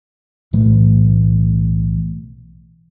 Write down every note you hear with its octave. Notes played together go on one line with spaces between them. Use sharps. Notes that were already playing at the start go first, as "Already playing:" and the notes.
B1 A2 E3 A3